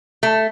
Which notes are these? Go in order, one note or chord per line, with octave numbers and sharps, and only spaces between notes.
A3